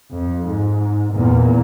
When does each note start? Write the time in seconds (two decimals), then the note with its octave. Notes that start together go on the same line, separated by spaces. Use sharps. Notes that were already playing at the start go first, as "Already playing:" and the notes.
0.11 F2
0.46 G#2
1.14 E2 A#2